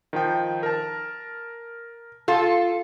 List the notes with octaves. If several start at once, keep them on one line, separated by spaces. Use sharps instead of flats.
D#3 F3 G5
A#4 A5
F4 A4